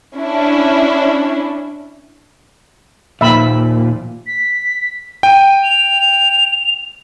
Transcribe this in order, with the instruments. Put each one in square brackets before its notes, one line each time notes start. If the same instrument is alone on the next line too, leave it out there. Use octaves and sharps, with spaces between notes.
[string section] C#4 D4 E4
[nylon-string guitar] D#2 F3 G5 [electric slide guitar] A#2 [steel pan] E5 B5
[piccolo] B6
[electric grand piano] G5 [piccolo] D#7
[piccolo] F7